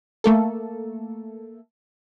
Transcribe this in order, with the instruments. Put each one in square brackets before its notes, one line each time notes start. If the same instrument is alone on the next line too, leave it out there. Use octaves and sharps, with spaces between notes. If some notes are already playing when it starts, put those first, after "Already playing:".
[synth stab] A3 A#3 A4